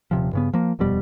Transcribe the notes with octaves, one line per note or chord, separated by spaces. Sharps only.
D#1 C3 F3
G2 C#3 B3
F3 A#3
D#1 F2 B2 G3